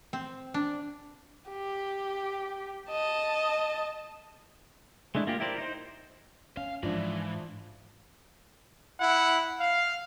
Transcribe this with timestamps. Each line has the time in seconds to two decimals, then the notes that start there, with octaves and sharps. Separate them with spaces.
0.13 C4
0.54 D4
1.49 G4
2.89 D#5 A5
5.15 G#3 A3 D4 E4
5.27 A#3 F4 G4
5.40 E4 G4 A#4 C5 D5
5.58 D#4 C5
6.57 C#4 F5
6.83 G#2 E3 F3 D4
9.00 E4 F#5
9.60 F5